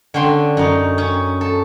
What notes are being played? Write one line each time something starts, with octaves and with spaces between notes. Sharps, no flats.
D3 C#4 D4 G5 C6
F#2 D#4
C#4
A4